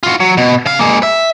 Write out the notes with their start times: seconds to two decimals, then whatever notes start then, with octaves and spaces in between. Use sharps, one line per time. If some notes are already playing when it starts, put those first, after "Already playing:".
0.03 F4 F#4
0.20 F#3
0.37 B2
0.66 C#3 F5
0.79 G#3 A#3
1.03 E5